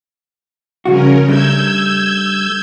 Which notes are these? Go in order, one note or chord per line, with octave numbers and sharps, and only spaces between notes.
G2 C#3 F3 C#4 F#4 A#4
G3 A3 D4 E6 G6 G#6